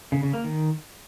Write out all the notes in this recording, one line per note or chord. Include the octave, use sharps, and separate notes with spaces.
C#3
C#3
A#3
D#3